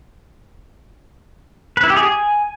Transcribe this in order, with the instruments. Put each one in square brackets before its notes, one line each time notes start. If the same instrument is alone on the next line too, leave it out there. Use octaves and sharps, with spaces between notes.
[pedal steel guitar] B4
E4
G4
G#4
G#5